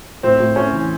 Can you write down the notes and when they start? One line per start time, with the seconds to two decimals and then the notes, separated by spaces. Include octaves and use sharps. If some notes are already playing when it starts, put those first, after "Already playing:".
0.23 A2 C4
0.40 A2
0.56 A2 C#4
0.73 E3